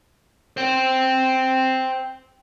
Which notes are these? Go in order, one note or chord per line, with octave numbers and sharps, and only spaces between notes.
C5 G5